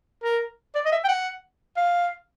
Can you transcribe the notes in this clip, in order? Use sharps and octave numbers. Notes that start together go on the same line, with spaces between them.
A#4
D5
D#5
E5
G5
F#5
F5